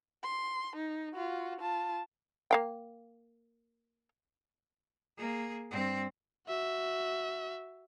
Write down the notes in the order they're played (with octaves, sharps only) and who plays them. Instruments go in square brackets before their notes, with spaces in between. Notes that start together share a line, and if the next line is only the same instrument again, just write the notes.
[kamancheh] C6
D#4
F4 F#4
F4 A5
[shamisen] A#3 F5 G5
[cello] A#3 G#4
G2 C4
[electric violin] F#4 E5